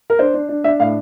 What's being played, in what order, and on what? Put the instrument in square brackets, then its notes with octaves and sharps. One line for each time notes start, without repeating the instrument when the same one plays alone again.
[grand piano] A#4
[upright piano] D4 [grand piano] C5
[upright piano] D4
D4
[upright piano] D4 [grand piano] E5
[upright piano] A2 [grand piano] F5